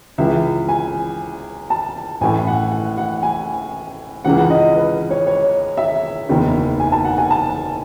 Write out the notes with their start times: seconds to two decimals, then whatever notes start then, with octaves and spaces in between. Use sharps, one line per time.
0.18 C#2 C#3 E3 E5
0.69 G#5
1.70 A5
2.21 A1 A2 E3 G#5
2.47 F#5
2.72 F#5
2.98 F#5
3.23 G#5
4.25 C#2 C#3 E3 F#5
4.38 F#5
4.50 D#5
4.76 B4
5.11 C#5
5.27 C#5
5.77 E5
6.29 F#1 E2 D#3
6.80 G#5
6.92 A5
7.04 F#5
7.18 G#5
7.31 A5